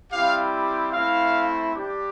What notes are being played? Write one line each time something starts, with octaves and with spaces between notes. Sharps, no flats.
G3 C4 E4 G4 F5
A3 C4 E4 F5
G3 D4 G4